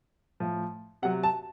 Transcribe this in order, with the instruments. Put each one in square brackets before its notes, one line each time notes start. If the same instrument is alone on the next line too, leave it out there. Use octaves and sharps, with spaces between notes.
[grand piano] A2 F3
C3 F#3 F#5
A5